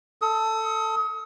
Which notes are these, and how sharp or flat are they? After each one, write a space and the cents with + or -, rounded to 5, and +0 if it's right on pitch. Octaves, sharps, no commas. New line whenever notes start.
A4 +10 D#6 +35